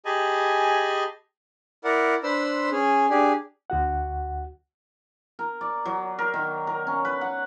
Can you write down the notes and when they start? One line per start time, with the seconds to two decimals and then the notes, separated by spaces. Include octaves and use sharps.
0.05 G4 G#4 D#5 G#5 A5 B5
1.84 E4 A#4 D5 F#5
2.24 D4 B4 C5 B5 C6 E6
2.72 C#4 G#4
3.10 D4 G4 G#4
3.70 D2 F#4 F#5
5.39 A#4
5.61 D5
5.85 F#3
6.19 A#4
6.34 D#3
6.67 A#4
6.87 C#4
7.05 B4
7.21 F#5